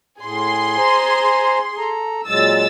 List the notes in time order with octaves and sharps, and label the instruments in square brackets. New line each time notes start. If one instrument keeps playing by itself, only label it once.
[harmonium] A2 [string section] G#4 C6
[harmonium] C5 G#5 A#5
A4 A#5
[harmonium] A#2 F#3 G#3 [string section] E6 A6